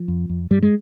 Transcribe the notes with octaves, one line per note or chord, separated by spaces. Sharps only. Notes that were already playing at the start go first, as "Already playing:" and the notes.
Already playing: F3
F2
F2
G2 G3
G#3